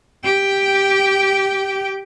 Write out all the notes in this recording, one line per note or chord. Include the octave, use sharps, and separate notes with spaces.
G4 G5